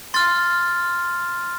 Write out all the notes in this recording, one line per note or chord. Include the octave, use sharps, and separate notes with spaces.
C6 F6 A6